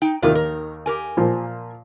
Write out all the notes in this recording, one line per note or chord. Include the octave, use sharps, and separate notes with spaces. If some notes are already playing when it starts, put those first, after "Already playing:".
D#4 G5
D#2 A2 C3 D#3 F4
A#4
G4 A#4 G#5
A#2 F3